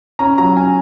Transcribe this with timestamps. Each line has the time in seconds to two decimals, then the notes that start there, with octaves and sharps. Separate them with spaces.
0.19 C#4 A#5
0.38 F#3 A#5
0.56 C#4 G#5